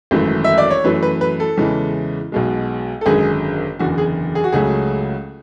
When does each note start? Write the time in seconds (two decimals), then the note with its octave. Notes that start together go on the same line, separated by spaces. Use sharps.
0.11 G#1 F#2 E3 A3
0.44 E5
0.58 D5
0.70 C#5
0.84 F#2 E3 A3 B4
1.03 B4
1.21 B4
1.40 A4
1.58 E2 C#3 E3 G#3
2.32 B1 B2 G#3
3.01 A4
3.06 G#1 F#2 D3 G#3 G#4
3.79 F#1 E2 D3 F#4
3.98 G#4
4.35 G#4
4.44 F#4
4.52 C#2 C#3 F#3 A3 G#4